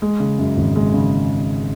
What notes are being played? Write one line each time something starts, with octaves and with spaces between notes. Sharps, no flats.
G#3
C#3
F#2
G#1
G#3
C#3